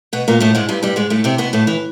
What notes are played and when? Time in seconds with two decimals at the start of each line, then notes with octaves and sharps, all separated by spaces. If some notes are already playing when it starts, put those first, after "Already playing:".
0.13 B2 B3
0.28 A#2 A#3
0.40 A2 A3
0.55 G#2 G#3
0.69 G2 G3
0.83 G2 G3
0.96 G#2 G#3
1.10 A2 A3
1.24 C3 C4
1.38 B2 B3
1.53 A2 A3
1.67 E3